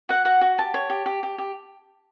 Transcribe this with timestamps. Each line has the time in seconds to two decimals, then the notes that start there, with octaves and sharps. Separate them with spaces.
0.09 F#4 F#5
0.25 F#4 F#5
0.41 F#4
0.58 G4 A5
0.74 C#5
0.90 G4
1.06 G4
1.23 G4
1.38 G4